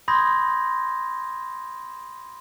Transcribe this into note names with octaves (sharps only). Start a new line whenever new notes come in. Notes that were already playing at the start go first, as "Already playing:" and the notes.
B5 C6 D#6 G6 G#6 A#6